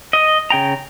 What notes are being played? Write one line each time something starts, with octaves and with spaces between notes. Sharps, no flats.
D#5
C#3 G5 A#5